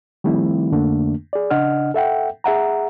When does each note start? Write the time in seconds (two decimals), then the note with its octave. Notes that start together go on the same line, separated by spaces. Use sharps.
0.24 D#3 F3 G3 A3 C4 E4
0.72 F2 D3 A3 A#3 D4
1.33 G#4 D5
1.50 C#3 D4 D#5 F#5 F6
1.94 A4 E5 F#5 G5
2.44 G#4 E5 F#5 A#5